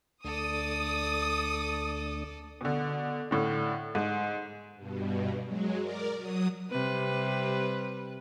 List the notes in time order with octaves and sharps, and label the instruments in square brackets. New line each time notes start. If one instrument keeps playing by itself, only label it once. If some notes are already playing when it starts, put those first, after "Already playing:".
[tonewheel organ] D2 A3 D4 [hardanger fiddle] A4 D5 [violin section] D#6
[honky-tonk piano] B2 D3
A2 D3
G#2
[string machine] G2 B2
F#3 G#3
A#4 D5
F#3 D#6
[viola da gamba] C3 G3 B4